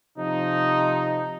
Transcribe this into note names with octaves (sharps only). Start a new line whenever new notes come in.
C3 F3 D#4